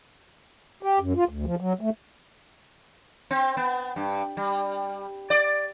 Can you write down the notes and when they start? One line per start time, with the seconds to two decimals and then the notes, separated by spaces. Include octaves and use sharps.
0.83 G4
1.00 F#2
1.15 F4
1.29 D2
1.46 F3
1.60 F#3
1.81 A3
3.31 C4
3.57 B3
3.96 G2
4.37 G3
5.30 D5